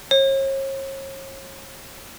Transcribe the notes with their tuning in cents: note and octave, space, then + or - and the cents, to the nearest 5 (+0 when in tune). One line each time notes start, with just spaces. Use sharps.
C#5 -40